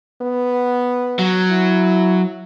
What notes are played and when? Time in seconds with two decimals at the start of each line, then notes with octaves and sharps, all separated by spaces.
0.22 B3
1.19 F#3
1.50 E4